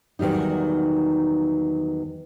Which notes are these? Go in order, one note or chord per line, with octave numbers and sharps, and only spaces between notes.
E2 D#3 F#3 G3 D#4